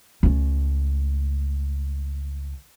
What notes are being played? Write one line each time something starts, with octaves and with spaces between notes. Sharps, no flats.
C#2 A3